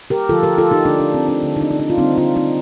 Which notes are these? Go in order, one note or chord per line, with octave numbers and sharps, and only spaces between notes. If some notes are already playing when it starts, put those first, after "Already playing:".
G4 A#4
D3 F3 A3 F4 A4
G4 A#4
F4 A4
D#4 G4
D3 A3 D4
D4
C4
D4
D3 A3
D#4
D4
D#4
D4
F4
D3 G3 A#3 C4 D#4
D4 F4
C4 D#4